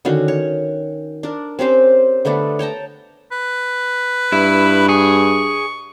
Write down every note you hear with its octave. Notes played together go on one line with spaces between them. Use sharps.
D3 D#3 C#4 F#4
C#5
D4 A#4
C4 C#4 G4 C5
D3 A3 B3 D4
C#5 G5 A5 A#5
B4
G2 E4
G#4 C#6